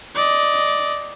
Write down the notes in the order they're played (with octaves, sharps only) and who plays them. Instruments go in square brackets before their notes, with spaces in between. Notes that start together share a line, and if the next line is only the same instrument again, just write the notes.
[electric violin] D5 D#5